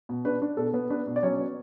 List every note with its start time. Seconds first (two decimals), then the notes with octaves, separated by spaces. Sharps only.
0.09 B2
0.25 D4 B4
0.42 D4
0.57 B2 A4
0.74 B3
0.90 D4 B4
1.07 B2
1.16 D5
1.23 F#3 C#4 C#5
1.39 B3